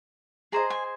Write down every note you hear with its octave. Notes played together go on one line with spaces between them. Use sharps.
G#4 C5 D#5 A#5
G#5